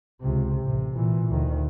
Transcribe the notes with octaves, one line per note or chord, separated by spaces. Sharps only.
C#2 C3
A1 C3
A#2 E3
D2 D#3